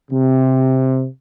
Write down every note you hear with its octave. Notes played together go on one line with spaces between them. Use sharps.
C3